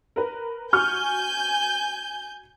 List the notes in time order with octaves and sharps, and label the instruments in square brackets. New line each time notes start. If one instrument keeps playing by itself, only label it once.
[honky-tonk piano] A#4 B4
[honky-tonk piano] F#4 C#6 F6 [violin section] G#5 G6